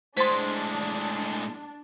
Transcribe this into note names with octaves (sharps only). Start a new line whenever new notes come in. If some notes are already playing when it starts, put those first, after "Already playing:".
A2 G#3 D4 C5 C6 A6 B6